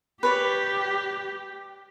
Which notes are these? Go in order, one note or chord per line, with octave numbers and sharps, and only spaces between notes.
G4 B4 C#5 D5